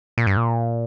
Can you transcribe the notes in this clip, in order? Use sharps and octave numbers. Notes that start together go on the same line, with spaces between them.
A#2
G2
A#2